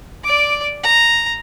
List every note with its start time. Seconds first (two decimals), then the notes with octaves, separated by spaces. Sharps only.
0.23 D5 D6
0.83 A#5